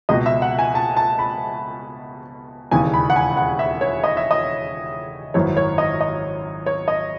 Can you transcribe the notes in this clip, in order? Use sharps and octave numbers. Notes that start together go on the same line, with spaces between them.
C#2 B2 D#5
E5
F#5
G#5
A5
A5
B5
E1 D#2 C#3 E3 G#5
B5
F#5
G#5
F#5
E5
C#5
D#5
E5
D#5
G#1 F#2 E3 C#5
C#5
D#5
D#5
C#5
D#5